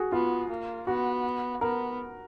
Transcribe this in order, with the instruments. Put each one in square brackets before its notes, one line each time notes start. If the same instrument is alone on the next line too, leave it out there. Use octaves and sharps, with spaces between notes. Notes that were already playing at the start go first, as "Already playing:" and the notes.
Already playing: [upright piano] F#4 G#4
[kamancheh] B3 [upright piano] F4
[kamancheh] A#3
[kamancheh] B3 [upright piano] F#4
[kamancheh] B3 [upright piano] A#4